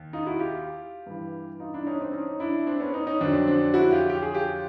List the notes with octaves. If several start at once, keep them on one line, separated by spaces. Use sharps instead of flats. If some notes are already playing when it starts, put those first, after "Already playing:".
Already playing: D#2
D#4 F4
E4 F#4
F4 G4
G2 E3
D#4 F4
D4 E4
C#4 D#4
C4 D4
C#4 D#4
D4 E4
C4 D4
B3 C#4
C#4 D#4
C#4 D#4
F2 D3 F#3 C4 D4
C4 D4
E4 F#4
F4 G4
G4
G#4
F4 G4